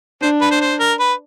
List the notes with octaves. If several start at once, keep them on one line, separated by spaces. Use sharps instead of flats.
D4 C5
B4
C5
C5
A#4
B4